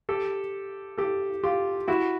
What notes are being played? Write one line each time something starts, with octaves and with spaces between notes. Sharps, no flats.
G4 A4
G4 A4
F4 G4
E4 F#4